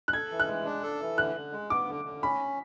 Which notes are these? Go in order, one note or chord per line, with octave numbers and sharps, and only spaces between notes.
F#6
A4 G#6
E3
F#6
G#3
D4
A4
E3
D3 F#6
D3
G#3
B3 D6
D3
D3
C#4 B5